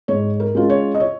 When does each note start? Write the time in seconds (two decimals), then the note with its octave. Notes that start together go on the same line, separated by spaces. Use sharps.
0.08 G#2 C#5
0.40 A#4
0.55 G#3 C#4 F4
0.70 C#5
0.95 D#5
1.00 C#5